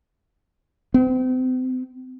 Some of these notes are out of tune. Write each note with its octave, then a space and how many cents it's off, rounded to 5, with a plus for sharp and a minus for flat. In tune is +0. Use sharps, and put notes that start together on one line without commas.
C4 -35